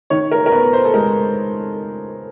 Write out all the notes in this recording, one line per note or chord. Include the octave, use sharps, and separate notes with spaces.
D#3 C#5
A#4
A#4
B3 B4
C5
A4
G#3 A#4